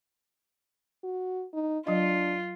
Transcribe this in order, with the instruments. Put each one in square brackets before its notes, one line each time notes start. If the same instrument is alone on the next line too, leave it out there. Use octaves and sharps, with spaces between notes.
[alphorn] F#4
D#4
[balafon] F#3 D#5 [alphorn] D4 [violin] F4